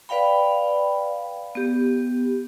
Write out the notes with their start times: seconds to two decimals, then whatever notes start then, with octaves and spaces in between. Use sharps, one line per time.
0.09 B4 D5 F5 G5 B5
1.55 B3 G4